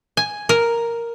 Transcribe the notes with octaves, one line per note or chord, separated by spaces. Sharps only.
G#5
A#4